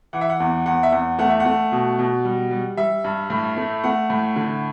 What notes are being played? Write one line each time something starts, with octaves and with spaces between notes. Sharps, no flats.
E3 F#5
E5
F#5
E2
E2 F#5
E5
E2 F#5
A3 F#5
E5
F#5
A3
B2
B2
G3
G3
G3 E5
G2
A2
A3
A3 F#5
A2
D3